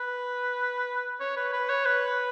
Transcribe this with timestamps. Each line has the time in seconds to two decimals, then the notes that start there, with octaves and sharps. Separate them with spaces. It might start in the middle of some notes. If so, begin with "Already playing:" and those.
Already playing: B4
1.20 C#5
1.37 B4
1.53 B4
1.69 C#5
1.86 B4